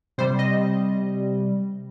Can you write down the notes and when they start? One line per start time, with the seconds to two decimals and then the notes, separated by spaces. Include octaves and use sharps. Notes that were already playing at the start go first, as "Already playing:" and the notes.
0.18 C3 G3 C5
0.39 D#5